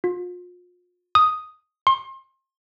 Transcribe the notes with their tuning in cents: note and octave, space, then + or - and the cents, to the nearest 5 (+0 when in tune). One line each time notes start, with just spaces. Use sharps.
F4 +35
D#6 +0
C6 +35